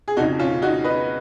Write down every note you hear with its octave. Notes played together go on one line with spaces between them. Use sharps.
G#4
F2 C#3 D#4 F#4
C#4 F4
D#4 F#4
B4 D#5